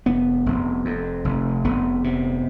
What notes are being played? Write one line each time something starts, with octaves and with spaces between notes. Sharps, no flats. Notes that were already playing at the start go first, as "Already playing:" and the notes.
F1 B3
F1
F2
F1
F1 B3
C3